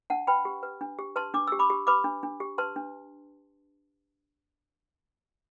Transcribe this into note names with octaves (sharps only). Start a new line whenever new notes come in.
D4 F#5 A5
B4 G5 B5
G4
B4
D4
G4
B4 A5 C6
D4 D6
G4 E6
B5 D6
G4
B4 B5 D6
D4
D4
G4
B4 A5 C6
D4